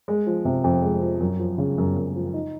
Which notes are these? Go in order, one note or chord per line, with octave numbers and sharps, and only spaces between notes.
G#3
F3
C3
F2
G#3
F3
F#2
F3
C#3
F#2
F#2
F3
D#4